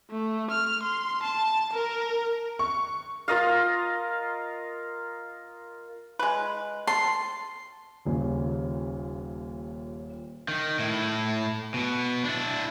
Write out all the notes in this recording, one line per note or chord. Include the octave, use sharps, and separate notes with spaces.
A3
F6
C6
A5
A#4
C#6
F4 A#4 D#5 F5
G#3 B4
A5 C6
D#1 D#2 A#2 C#3
D#3
A2 E4
B2 B3
D4 E4